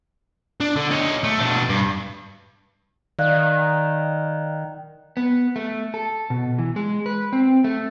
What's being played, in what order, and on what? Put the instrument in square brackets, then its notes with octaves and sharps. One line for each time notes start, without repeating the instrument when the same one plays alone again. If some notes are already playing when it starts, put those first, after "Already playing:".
[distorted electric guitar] D4
D3
D#4 C#5
A3
B2 D4
G2
[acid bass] D#3 [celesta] D5 F5 F#6
[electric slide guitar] B3
A3
A4
B2
E3
G#3
B4
C4
A3